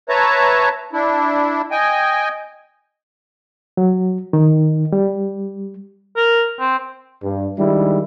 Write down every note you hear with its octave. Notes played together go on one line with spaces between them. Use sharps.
B4 C#5 E5 A5 A#5
D4 E4
D#5 G5 G#5
F#3
D#3
G3
A#4
C4
G2
D#3 G3 G#3 D4 E4